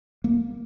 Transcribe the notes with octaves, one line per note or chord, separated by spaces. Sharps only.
A#3